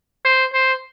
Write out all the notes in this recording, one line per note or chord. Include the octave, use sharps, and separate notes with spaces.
C5
C5